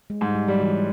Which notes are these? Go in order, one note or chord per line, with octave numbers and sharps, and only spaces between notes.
G#3
G#2 G3
G3
F#3 G3
E3